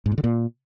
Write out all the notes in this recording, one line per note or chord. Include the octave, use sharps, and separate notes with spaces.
G#2
A#2
D3
A#2